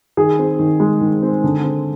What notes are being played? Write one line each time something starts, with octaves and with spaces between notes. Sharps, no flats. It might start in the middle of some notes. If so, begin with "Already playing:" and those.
D#3 G#4
C4
D#3
G#3
D#3
C4
D3
C4